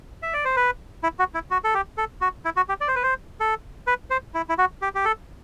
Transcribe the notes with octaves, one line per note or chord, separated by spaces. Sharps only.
E5
D5
C5
B4
E4
F#4
E4
F#4
A4
G4
A4
F#4
E4
F#4
G4
D5
C5
B4
C5
A4
B4
C5
E4
E4
F#4
G4
G4
A4